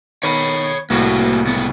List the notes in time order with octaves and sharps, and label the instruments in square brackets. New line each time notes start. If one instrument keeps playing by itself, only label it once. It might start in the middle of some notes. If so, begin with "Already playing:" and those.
[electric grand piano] D#3 B3 [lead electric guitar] C#5 B5
[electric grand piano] C2 A2 [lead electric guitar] A#3 F#4
[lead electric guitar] C#2 B3